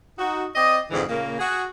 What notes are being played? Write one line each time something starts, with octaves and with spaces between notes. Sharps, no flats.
D#4 F#4
C4 D5 D#5
F2 G#2 D3 E3
A#2 C#3 A#3
F#4 G#4